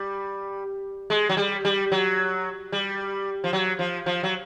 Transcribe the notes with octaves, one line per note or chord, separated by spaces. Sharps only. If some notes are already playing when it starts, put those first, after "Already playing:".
Already playing: G3
G#3
F#3
G3
G3
F#3
G3
F3
F#3
F3
F3
F#3